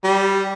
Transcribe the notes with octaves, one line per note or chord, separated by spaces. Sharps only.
G3